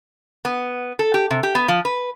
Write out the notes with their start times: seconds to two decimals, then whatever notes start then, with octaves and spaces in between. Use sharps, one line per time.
0.45 B3
0.99 A4
1.14 G4
1.31 C3
1.43 G4
1.55 B3
1.68 F3
1.85 B4